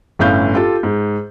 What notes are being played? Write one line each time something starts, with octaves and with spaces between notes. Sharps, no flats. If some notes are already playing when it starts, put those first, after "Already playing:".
G1 A2 C#4 F5 G6
F4 G4 A4
G#2